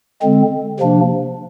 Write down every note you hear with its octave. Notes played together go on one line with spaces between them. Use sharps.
D3 G#3 C4
C3 F3 A#3 D4